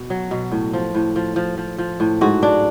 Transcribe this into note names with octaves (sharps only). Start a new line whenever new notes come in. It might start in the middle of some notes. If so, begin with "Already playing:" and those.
Already playing: B2
F#3
B2
A2
F3
A2
F3
F3
F3
F3
A2
G#2 F#4
F#3 D4